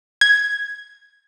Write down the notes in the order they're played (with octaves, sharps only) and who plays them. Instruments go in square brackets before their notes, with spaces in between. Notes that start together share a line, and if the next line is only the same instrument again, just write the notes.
[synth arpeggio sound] G#6